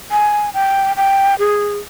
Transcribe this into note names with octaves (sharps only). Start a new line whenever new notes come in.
G#5
G5
G5
G#4